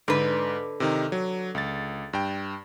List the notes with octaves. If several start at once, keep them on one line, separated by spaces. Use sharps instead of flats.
G#2 D3 B4
C3 D#3 D#4
F#3
C#2 A6
G2 G5